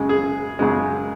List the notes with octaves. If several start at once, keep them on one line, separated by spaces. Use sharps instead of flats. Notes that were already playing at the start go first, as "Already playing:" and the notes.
Already playing: F#2 C#3 G#3
G#4
F#2 C#3 G#3